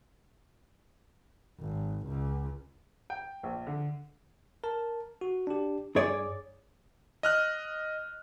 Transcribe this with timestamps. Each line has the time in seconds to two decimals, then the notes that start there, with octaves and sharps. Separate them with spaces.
1.60 G#1
2.07 C#2
3.10 G5
3.43 A#1
3.67 D3
4.64 A#4 A5
5.21 F#4
5.47 D4 G4
5.96 G2 G#4 C#5 D5
7.23 D#5 F6 F#6